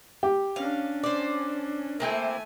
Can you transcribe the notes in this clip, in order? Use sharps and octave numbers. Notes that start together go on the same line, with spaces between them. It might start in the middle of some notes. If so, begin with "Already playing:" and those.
G4
C#4 D4 F5
C5 D5
A3 A#3 C4 E4 G#5